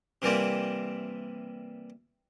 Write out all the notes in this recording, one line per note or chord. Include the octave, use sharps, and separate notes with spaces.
C3 E3 G3 A#3 C4